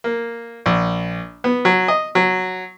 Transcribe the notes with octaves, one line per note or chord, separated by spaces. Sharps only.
A#3
A#1
B3
F#3
D#5
F#3